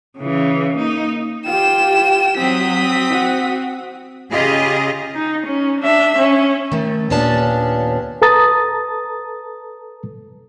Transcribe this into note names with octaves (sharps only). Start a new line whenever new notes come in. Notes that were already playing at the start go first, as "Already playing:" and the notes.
C#3 E3
A#3 D#4
F4 G4 G5 E7
F#3 C4 D#6 B6
F#4
C#3 F4 G4 G#4 D#5
D#4
C#4
D4 E5
C#4
D#3 A3
D#2 A#2 B3 C#4 D4 A5
A4 B4 A5 A#5 D#6 A6